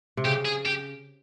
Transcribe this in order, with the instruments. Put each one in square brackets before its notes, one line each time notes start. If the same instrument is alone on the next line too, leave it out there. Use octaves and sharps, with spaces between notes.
[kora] C3
[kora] C#3 [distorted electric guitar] G4
[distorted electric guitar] G#4
G4